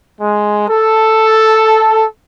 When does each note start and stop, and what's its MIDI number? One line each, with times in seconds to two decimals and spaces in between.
0.21 0.66 56
0.68 2.05 69